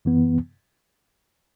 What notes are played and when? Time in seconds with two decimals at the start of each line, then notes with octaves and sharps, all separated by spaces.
0.05 F#2 E3 B3